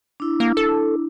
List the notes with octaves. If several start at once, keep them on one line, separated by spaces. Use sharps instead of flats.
D4 E4
A#3
A4